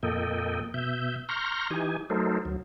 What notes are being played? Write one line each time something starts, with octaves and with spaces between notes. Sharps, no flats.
F2 A#2 A#3 A4 D#5 G5
B2 E5 G6
A#5 C6 C#6 F6 G6 A#6
E3 D#4 G4 G#5
F#3 A3 D#4 A4 A#4 C5
D2 F#3